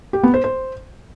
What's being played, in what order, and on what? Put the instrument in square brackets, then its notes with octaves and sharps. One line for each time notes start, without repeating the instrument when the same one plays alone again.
[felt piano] G4
B3
C5
C5